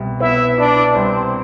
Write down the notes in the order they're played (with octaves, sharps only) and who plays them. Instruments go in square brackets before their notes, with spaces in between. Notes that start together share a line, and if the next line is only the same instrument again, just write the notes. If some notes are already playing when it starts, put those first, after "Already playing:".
Already playing: [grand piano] C2 B2
[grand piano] B3 [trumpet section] E4 E5
[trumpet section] D4 D5 [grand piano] E4
[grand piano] C2 [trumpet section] C4 C5